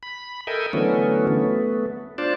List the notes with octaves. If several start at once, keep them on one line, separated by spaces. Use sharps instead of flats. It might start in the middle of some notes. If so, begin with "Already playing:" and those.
B5
A4 A#4 D#5 E5 G5 G#5
D3 E3 F#3 A3 B3 C#4
A3 B3
D4 F4 C5 D5 A5